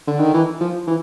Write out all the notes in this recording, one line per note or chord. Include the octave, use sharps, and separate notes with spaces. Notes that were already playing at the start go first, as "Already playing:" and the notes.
D3
D#3
E3
F3
E3